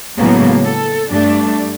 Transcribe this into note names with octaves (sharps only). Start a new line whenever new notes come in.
A2 C#3 F#3 G#3 A#3 B3
A4
G2 G3 A3 D4